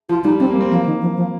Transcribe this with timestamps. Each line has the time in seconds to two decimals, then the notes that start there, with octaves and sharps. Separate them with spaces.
0.09 F3 F4
0.24 G3 D#4
0.40 G3 C4
0.50 A#3
0.56 G3
0.61 C4
0.71 F3 A#3
0.86 D#3
1.01 F3
1.17 F3